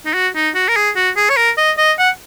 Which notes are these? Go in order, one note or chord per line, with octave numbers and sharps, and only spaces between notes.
D#4
F#4
D#4
F#4
A#4
G#4
F#4
G#4
C#5
A#4
D#5
D#5
F#5